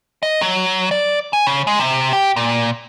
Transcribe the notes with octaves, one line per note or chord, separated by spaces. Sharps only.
D#5
F#3
D5
G#5
C#3
G#3
C3
G4
A#2